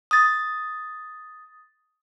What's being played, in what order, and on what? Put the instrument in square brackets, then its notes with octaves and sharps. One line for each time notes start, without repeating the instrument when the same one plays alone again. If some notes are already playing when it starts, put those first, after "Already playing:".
[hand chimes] D#6 A6